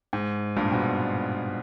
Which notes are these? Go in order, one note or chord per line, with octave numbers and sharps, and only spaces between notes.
G#2
G2 A#2
G#2 B2